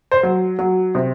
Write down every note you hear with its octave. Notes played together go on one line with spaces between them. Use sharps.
C5
F#3
F#3
C3